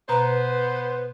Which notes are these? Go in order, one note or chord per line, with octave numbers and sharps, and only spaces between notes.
B2 B3 B4 C5 A#5